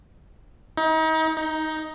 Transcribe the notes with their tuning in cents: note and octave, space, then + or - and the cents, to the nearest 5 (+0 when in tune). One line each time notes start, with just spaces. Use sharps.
D#4 +35
D#4 +10